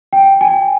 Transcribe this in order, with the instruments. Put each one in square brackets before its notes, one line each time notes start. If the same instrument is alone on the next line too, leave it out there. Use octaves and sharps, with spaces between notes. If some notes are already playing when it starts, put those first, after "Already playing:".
[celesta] G5
G#5